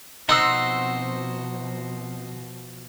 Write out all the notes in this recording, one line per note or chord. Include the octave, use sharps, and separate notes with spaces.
B2 F3 C4 D#4 F#4 C5 F#5 E6